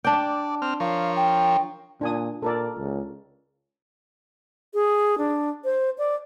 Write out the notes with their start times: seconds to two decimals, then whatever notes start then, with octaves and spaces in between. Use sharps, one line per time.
0.04 D4 D5 G5
0.62 C4 F6
0.80 F3 A#4 C#5 F5
1.16 G5
2.01 A#2 D4 G#5 D#6
2.42 A#2 A4 A#4 D5
2.78 C#2
4.74 G#4
5.18 D4
5.64 C5
5.98 D5